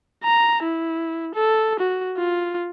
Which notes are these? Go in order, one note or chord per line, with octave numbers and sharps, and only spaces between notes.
A#5
E4
A4
F#4
F4